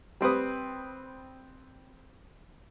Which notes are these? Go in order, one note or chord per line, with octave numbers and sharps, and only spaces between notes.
G3 C4 B4 D#6